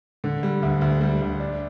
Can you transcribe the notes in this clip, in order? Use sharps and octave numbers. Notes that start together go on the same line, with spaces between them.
D3
G3
D2
D2
G3
D2
D4